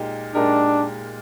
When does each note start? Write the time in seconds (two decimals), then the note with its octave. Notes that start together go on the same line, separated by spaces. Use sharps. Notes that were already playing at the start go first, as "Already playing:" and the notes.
Already playing: A#2 G#3 D#4 G4 A#4
0.34 A#2 G#3 D4 D#4 G4 A#4